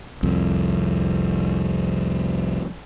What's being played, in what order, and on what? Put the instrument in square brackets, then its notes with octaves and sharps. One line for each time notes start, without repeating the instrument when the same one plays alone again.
[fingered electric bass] C2 F2